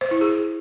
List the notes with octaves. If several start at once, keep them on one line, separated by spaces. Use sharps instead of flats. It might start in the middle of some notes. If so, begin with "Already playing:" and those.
C5
E4
G#4